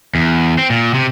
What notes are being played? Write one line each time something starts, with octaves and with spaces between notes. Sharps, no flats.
E2
C4
A#2
C3